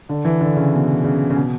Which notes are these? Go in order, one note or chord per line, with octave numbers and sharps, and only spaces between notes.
D3
E3
D3
C#3
B2
C#3
C#3
B2